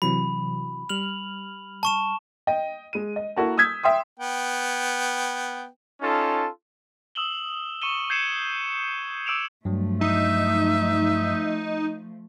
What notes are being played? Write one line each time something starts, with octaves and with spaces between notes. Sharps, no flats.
C3 E3 F#3 B5
G3 F6 F7 F#7
A5 C#6 E7
D#5 G5
G#3 D#7
D#5
A#3 E4 F#4 A4 A#4 A5
D#6 E6 G6 G#6 B6
E5 G5 C6 D#6
B3 G5
C#4 D#4 F4 A4 A5
D#6 E6 E7 F#7 G7
C#6 C#7 D#7 E7 G7
G6 G#6 C7 C#7 E7
D6 E6 D7 E7 F7
G2 F3 F#3 A3
D#4 E5